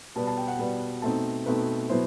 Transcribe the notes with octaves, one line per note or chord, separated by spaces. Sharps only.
B2 G3 B3 A5
A5
G5
F#5
B2 G3 B3
B2 A3 C4 D#4 A5
B2 A3 C4 D#4 B4
B2 F#3 B3 E4 C5